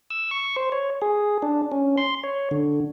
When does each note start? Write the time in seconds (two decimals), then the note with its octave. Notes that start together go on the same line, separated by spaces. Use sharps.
0.10 E6
0.31 C#6
0.56 C5
0.72 C#5
1.02 G#4
1.42 D4
1.72 C#4
1.97 C6
2.24 C#5
2.51 D3